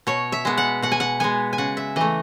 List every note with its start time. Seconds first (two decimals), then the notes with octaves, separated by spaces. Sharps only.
0.07 B2 C#5
0.32 E5
0.45 G#3 B3
0.58 F#5
0.82 B2 F#5
0.92 G#5
1.00 F#5
1.20 G#3 B3 G#5
1.53 G#5
1.58 C#3 F#5
1.77 E5
1.96 E3 A3 D#5